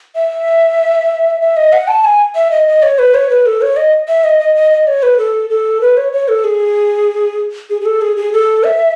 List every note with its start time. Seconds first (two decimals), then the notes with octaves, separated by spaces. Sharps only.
0.16 E5
1.41 E5
1.57 D#5
1.73 F#5
1.88 A5
2.04 G#5
2.35 E5
2.51 D#5
2.67 D#5
2.83 C#5
2.99 B4
3.14 C#5
3.30 B4
3.46 A4
3.62 C#5
3.77 D#5
4.08 E5
4.24 D#5
4.39 D#5
4.55 D#5
4.71 D#5
4.87 C#5
5.03 B4
5.18 A4
5.50 A4
5.81 B4
5.97 C#5
6.13 C#5
6.28 A4
6.44 G#4
7.70 G#4
7.81 G#4
7.86 A4
8.01 G#4
8.17 G#4
8.33 A4
8.64 E5